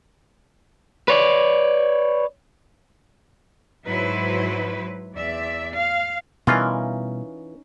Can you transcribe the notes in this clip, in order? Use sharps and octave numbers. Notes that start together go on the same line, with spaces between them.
B4 C#5 D5
G#2 F#3 E4 B4 C5
E2 D5 E5
F5
B2 E3 G3 C#4 D#4 F4 A#4